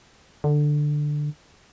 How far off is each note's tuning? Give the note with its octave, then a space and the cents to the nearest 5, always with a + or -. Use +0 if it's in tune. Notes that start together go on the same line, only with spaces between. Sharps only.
D3 +10